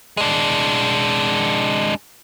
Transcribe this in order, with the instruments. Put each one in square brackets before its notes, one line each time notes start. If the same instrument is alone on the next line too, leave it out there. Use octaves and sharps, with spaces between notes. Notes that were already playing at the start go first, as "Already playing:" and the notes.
[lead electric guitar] G#3 D4